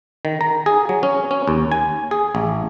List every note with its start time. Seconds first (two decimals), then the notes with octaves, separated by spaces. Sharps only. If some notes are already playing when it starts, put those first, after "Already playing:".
0.25 D#3
0.41 A#5
0.66 G#4
0.89 F#3
1.03 C#4
1.31 C#4
1.48 D#2
1.72 G#5
2.11 G#4
2.35 A1